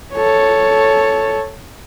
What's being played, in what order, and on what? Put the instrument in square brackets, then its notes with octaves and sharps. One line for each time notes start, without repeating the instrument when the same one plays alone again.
[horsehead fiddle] A4 C#5